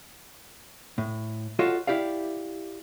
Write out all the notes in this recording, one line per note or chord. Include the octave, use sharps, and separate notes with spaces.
A2
F4 F#4 A4 C#5 D#5 F5
E4 G4 D5 F5